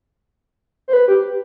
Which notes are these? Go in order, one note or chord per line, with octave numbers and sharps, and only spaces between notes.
C5
B4
G4